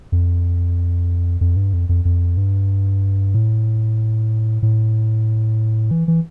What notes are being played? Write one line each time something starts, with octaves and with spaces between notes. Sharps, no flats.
F2
F2
G2
F2
F2
F2
G2
A2
A2
E3
E3